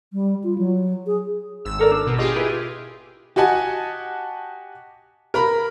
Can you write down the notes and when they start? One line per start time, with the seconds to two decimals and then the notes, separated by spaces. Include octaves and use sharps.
0.13 G3
0.44 F4
0.58 F#3
1.07 G#4
1.65 G#1 E6
1.79 A4 A#4 D5
1.91 D4
2.06 B2
2.18 F4 G4 G#4 D#5
2.35 E4 B4
3.36 F#4 G4 D#5 F#5 G#5 A5
5.34 A#4 A#5 B5